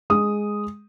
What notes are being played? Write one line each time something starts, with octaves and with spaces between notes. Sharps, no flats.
G#3 D#6